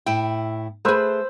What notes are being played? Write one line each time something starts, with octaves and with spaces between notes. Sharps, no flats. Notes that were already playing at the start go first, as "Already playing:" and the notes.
A2 E4 G5
A3 G#4 B4 C5 E6